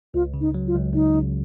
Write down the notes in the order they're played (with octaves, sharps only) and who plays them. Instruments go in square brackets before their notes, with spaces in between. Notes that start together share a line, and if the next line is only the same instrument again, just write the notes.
[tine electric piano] C#2 [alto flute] F4
[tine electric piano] C#3
[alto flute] D#4
[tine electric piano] F#3
[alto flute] F4
[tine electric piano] C#2
[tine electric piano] C#2 [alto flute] D#4
[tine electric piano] C#3